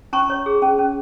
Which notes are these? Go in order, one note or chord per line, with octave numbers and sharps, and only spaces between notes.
C#4 A#5 C#6
C#5
G#4
C#4
C#4